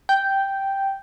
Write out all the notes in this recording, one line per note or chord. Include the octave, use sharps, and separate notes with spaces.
G5